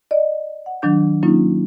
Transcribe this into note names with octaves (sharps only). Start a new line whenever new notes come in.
D5 D#5
F#5
D#3 F#3 D4 G6
F#3 A#3 C#4 D#4 F4